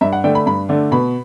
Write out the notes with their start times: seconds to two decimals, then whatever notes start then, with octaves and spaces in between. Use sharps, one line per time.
0.01 G2 E5
0.13 F#5
0.24 D3 A3 D4 G5
0.35 B5
0.46 G2 B5
0.69 D3 A3 D4
0.92 B2 B5